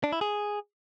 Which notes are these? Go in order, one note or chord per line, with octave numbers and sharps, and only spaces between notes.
D4
E4
G#4